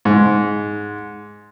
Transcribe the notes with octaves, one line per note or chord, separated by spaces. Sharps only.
G#2